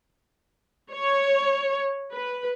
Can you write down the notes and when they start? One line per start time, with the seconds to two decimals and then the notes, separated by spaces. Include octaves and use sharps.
0.91 C#5
2.12 B4